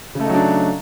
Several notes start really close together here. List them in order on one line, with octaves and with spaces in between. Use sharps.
C#3 A3 D#4 F#3 D4